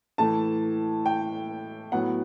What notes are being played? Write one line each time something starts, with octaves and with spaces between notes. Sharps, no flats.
A2 E3 A3 A5
G5
A2 F#3 B3 F#5